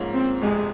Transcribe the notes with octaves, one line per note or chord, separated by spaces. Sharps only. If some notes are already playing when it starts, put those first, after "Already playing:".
Already playing: G#2 F3 A#3 C#4
C4
G1 F2 C3 G#3